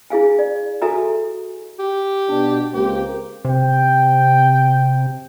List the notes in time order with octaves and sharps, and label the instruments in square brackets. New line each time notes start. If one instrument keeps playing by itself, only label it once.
[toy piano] E4 G#4 F5 G#5
D5
F#4 A4 E5 G#5 A#5
[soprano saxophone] G4
[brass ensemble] B2 D4
[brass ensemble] C#2 A#3 C4 [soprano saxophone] G4
[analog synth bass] C3 [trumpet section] G5